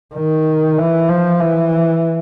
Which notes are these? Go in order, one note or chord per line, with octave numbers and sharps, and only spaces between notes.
D#3
E3
F3
E3